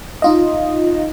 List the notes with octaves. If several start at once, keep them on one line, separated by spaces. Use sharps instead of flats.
D#4 F4 D#5